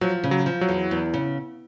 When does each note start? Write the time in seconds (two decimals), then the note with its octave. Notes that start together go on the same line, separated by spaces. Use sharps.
0.01 F3 F#3
0.24 C#3
0.31 F#3
0.46 F3
0.61 F#3
0.68 E2
0.91 E2
1.14 C#3